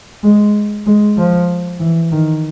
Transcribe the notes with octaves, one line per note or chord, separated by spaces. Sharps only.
G#3
G#3
F3
E3
D#3